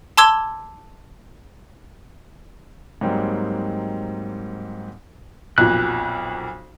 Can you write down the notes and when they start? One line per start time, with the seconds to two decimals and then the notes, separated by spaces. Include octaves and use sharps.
0.18 A5 C6 D6 E6 G#6 G7
3.01 G#2 F#3 G3 A#3 C4 D#4
5.58 B1 F2 A#2 F#6